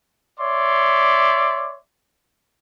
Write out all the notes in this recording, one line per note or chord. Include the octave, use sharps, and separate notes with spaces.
C#5 D5 E5 C6